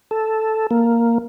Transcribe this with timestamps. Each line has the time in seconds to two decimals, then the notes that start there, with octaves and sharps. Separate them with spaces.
0.11 A4
0.71 A#3